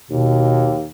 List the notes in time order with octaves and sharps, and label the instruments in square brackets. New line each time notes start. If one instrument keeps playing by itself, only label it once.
[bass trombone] D#2 [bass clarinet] B2